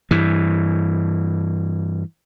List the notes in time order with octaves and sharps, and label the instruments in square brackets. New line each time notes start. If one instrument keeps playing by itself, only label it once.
[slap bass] G2 E3